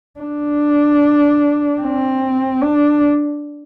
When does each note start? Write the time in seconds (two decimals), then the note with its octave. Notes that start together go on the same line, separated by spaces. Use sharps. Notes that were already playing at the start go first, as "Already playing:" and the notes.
0.20 D4
1.82 C4
2.62 D4